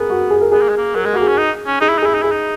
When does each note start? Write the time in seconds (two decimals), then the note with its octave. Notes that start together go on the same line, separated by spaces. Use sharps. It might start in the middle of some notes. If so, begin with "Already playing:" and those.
Already playing: B3 G#4 A#4
0.10 F#4
0.30 G#4
0.41 A#4
0.51 B3 G#4
0.61 A#3
0.69 G#3
0.77 A#3
0.95 F#3 A#4
1.04 G#3 G#4
1.13 A#3 F#4
1.22 G#4
1.27 C#4
1.38 D#4
1.67 C#4
1.81 D#4 G#4
1.89 E4
1.98 D#4
2.02 G#4
2.06 E4
2.14 D#4
2.22 E4 G#4
2.31 D#4